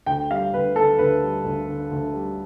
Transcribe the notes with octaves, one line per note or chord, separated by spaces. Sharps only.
D2 G5
G3 F5
D2 B4
D3 A4
D2 B4
G3
D2
D3
D2
G3